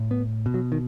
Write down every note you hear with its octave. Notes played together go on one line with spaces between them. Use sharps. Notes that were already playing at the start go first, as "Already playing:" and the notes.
Already playing: A2
B3
B2
F#3
D#3